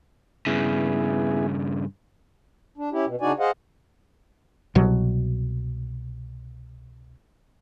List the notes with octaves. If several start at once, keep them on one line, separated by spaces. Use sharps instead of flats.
G2 C#3 B3 E4 G#4
D4
C#4 E4 G4
B2
C#3 D4 D#4 F#4 D5 G#5
G#4 C5 D#5 F5 F#5
C2 B2 F#3